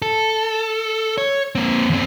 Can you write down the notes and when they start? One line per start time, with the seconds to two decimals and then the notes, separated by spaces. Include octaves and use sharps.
0.02 A4
1.18 C#5
1.55 A#3 C4
1.90 E2 C4